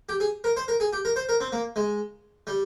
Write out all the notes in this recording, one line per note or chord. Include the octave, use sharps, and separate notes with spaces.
G4
G#4
A#4
C5
A#4
G#4
G4
A#4
C5
A#4
C4
A#3
G#3
G3